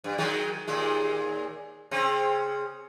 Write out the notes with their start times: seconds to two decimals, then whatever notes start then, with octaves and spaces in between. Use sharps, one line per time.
0.04 G2
0.18 D#3 F#3 G#3
0.68 D#2 A#2 G#3
1.91 C#3 C4